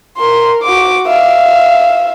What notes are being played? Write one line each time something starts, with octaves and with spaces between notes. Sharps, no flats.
A#4 C6
F#4 D6
E5 F5